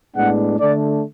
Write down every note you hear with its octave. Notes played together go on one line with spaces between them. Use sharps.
A2 G#3 B3 D4 F#5
D3 A3 D4 D5